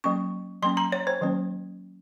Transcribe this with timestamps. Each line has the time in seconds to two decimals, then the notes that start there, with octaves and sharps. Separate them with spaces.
0.04 F#3 A#3 C#4 C#6
0.62 F#3 A#3 C#4 C6
0.77 A#5
0.92 C#5
1.07 C5
1.21 D#3 F#3 A#3 C#4